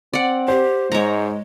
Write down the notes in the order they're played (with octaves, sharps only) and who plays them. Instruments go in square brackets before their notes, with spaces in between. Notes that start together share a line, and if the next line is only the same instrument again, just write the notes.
[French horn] C4 [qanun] D5 F#5
[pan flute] G4 [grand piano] C5
[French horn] G#2 [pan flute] G#3 [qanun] C#5 A#5